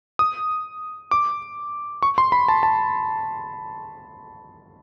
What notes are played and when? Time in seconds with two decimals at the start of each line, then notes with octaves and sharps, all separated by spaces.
0.19 D#6
1.11 D6
2.03 C#6
2.18 C6
2.32 B5
2.48 A5
2.63 A5